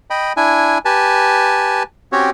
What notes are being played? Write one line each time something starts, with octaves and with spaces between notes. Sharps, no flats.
D#5 G5 B5
D4 E4 G#5
G4 B4 G#5 A5
C4 C#4 F#4 G4 C#5